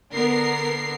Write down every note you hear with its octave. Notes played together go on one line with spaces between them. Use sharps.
D3 B3 A#4 C7